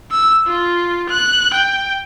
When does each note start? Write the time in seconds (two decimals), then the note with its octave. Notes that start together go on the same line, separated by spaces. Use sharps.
0.11 E6
0.47 F4
1.09 F#6
1.53 G5